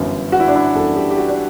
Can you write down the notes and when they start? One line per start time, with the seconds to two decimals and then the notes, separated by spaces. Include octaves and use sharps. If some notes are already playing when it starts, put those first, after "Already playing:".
Already playing: G1 F#2 E3
0.32 F#4
0.40 E4
0.48 D4
0.55 E4
0.75 G1 F#2 E3 A4
0.96 G4
1.10 G4
1.18 F#4
1.28 D4